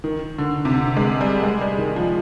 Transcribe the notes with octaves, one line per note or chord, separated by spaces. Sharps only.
D#3
D3
C3
D3
G#3
G3
G#3
G3
D#3
F3